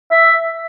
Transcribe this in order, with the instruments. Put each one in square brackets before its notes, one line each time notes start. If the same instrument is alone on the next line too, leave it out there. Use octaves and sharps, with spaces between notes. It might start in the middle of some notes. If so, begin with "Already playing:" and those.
[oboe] E5